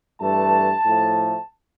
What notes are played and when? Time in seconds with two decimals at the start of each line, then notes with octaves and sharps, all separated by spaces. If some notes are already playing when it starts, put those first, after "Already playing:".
0.21 G2 E3 A3 A5
0.85 A2 F3 A3